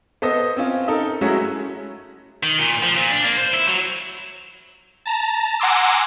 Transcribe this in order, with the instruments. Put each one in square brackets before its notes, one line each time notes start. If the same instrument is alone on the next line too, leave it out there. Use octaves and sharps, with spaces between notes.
[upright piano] B3 A4 C5 D#5
C4 C#4 F4
D#4 A4 A#4
F#3 G#3 A3 C#4 E4 F#4
[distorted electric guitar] D#3
A#2
F3
A#2
D4
A#3
C5
E4
F#3
[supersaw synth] A5 A#5
F#5 G#5 A#5 C6 D6 E6